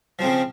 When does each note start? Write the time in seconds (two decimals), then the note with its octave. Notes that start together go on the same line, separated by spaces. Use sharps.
0.19 F3
0.22 C4
0.25 C#3